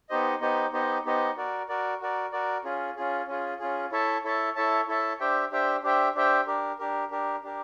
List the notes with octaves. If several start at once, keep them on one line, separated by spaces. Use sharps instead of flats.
B3 D#4 G4 C5 D#5
B3 D#4 G4 C5 D#5
B3 D#4 G4 C5 D#5
B3 D#4 G4 C5 D#5
F#4 A#4 D5
F#4 A#4 D5
F#4 A#4 D5
F#4 A#4 D5
C#4 F4 G#4
C#4 F4 G#4
C#4 F4 G#4
C#4 F4 G#4
E4 A4 C#5 E5 A5
E4 A4 C#5 E5 A5
E4 A4 C#5 E5 A5
E4 A4 C#5 E5 A5
D4 G4 C5 E5 G5
D4 G4 C5 E5 G5
D4 G4 C5 E5 G5
D4 G4 C5 E5 G5
D4 G4 A#4
D4 G4 A#4
D4 G4 A#4
D4 G4 A#4